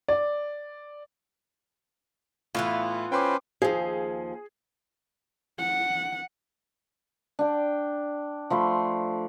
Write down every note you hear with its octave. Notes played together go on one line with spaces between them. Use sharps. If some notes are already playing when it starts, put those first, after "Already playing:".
D5
A2 E3 B3 F4
C#4 B4 C5 G5 C6 D6
D#2 F3 G#4
F#5
D4 G5
F3 A3 B5 C6